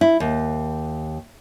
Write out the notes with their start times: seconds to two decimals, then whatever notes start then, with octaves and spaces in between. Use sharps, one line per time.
0.01 E4
0.20 D#2